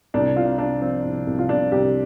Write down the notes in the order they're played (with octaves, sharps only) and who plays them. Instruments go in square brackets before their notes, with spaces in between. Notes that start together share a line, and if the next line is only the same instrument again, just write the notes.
[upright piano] C2 D4
C3 F4
C3 D4
F3 C4
C2
C2
F4
C2 D4
C2 G4